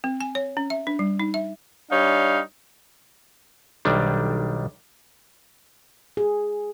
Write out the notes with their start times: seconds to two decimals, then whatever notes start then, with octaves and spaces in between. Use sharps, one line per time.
0.04 C4
0.21 G#5
0.35 C#5
0.57 C#4
0.70 E5
0.87 D4
0.99 G3
1.20 D#4
1.34 E5
1.90 G3 D4 D#4 C#5 F5
3.85 B1 D#3 G3 D4
6.17 G#4